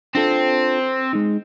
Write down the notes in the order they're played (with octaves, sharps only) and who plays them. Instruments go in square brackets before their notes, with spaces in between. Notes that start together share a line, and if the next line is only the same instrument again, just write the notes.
[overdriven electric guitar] C4 [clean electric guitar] D4 F4 A4
[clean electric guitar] G#3 D#4